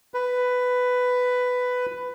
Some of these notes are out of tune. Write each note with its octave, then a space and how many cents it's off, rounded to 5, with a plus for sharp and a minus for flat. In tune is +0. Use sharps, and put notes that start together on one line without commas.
B4 +10